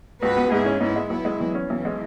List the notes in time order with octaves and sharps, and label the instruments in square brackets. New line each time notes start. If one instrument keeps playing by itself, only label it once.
[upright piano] C#2 [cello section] F#4 B4
[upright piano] B3
[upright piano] G#2 [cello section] E4 G#4
[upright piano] C#4
[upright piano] G#2 [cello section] B3 E4
[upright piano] G#3
[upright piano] B1 [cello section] B3 E4
[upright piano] G#3
[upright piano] E2 [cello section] F#3
[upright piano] C#4
[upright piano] B1 [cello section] E3
[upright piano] G#3